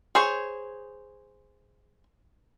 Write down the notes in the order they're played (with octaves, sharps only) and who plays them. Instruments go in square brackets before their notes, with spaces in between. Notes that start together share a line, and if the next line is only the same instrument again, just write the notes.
[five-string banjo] G#4 C5 C#5